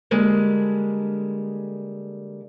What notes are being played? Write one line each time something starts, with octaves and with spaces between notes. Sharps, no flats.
D3 G3 G#3 A#3